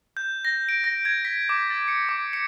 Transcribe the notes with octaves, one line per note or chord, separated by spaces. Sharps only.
G6
A#6
D7
A#6
G#6
B6
D6
A6
C#7
D6
C#7